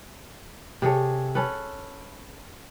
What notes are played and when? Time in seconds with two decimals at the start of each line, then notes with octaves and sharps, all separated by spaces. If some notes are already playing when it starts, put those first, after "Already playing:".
0.82 C3 G#4 A4 C#5
1.35 C#4 A4 B4